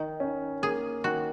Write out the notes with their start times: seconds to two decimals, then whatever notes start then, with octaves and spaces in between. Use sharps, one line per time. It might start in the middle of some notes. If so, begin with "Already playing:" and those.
Already playing: D#3 D#4
0.20 C#4
0.62 A#3 G#4
1.04 D#3 F#4